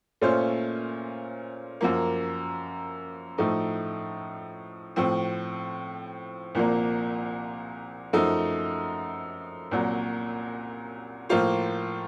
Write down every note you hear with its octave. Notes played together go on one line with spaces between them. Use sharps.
A#2 A3 C#4 F4 C5
F#2 F3 A#3
A2 F3 A3 D#4
A2 F3 C4
C2 A#2 F3 A#3
F#2 F3 A3 D#4
C2 A#2 F#3
A2 F3 A#3 F4 C5